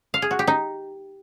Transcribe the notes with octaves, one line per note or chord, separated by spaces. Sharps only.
F5
G#4
F#4
G4
D#4